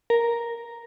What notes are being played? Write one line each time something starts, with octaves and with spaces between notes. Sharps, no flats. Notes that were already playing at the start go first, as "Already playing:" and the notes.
A#4